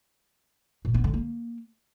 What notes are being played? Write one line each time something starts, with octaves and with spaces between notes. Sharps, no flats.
A#2
B3
D3
A#3